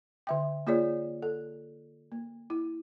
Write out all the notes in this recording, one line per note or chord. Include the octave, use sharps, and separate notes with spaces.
D3 E5 G5
A#3 F4 G#4 C#5 D5
A4
A#3
E4